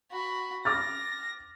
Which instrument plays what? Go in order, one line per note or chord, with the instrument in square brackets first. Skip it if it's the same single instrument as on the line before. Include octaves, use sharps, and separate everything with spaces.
[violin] F#4 B5
[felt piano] D6 F6 A6 [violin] A#6